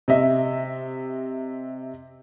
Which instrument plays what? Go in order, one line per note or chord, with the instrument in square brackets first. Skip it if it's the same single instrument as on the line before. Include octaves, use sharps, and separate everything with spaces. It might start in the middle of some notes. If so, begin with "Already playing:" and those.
[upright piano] C3 D#5 E5